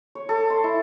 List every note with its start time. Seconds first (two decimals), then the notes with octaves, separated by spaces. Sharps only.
0.15 C#5
0.29 A4
0.50 C6
0.64 E4